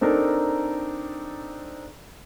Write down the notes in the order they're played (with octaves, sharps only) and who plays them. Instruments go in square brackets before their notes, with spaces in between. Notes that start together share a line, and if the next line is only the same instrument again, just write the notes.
[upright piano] C4 D4 D#4 A4 A#4